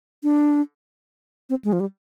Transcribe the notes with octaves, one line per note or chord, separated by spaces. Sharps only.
D4
C4
G#3
F3
G3